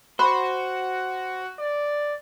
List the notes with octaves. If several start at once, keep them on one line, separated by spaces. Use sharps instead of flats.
F#4 C5 B5
D5